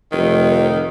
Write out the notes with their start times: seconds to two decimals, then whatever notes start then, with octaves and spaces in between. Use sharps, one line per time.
0.12 F1 D#3